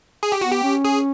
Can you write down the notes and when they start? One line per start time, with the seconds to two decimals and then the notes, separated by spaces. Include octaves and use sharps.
0.23 G#4
0.32 G4
0.41 B3 F#4
0.51 G4
0.63 C#4
0.85 G#4